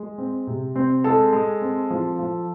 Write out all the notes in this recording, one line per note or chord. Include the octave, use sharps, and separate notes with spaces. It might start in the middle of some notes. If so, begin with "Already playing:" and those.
Already playing: G#3
C4
C3
C4
G#3 A4
G#3
C4
F3
F3